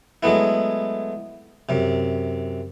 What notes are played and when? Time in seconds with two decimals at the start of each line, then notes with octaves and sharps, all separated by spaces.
0.23 F#3 G#3 A3 B3 E4
1.69 F#2 C3